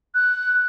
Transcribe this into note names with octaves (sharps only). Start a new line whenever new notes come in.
F#6